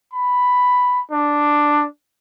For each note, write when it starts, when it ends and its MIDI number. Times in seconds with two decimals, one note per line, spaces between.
0.14 1.00 83
1.11 1.86 62